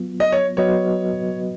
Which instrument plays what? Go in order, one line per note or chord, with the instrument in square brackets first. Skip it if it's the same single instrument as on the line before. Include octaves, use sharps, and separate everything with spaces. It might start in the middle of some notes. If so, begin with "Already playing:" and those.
Already playing: [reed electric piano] F#3 B3 F4
[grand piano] D#5
C#5
[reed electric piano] F#3 B3 F#4 B4 D#5 [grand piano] C#5